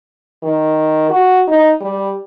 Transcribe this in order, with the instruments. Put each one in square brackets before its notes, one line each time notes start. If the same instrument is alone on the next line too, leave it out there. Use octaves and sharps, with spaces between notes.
[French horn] D#3
F#4
D#4
G3